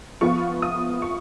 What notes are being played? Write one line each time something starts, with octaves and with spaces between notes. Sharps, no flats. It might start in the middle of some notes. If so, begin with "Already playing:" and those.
F3 B3 F4 C#6
D#6
C#6